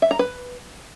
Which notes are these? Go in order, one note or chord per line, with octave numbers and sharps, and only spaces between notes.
E5
A#5
B4